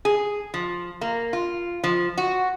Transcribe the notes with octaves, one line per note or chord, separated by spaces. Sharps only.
G#4
F3
A#3
F4
F3
F#4